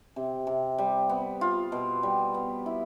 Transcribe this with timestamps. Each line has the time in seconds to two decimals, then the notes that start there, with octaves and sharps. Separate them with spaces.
0.16 C3
0.47 C3
0.78 G3
1.09 B3
1.41 F4
1.72 B2
2.03 G3
2.34 B3
2.66 E4